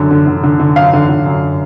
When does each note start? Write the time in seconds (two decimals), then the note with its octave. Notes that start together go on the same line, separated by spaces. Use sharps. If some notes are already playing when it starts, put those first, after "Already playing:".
Already playing: F#2 D3
0.11 D3
0.27 D3
0.43 D3
0.60 D3
0.76 F#2 F5
0.93 D3
1.09 D3
1.26 F#2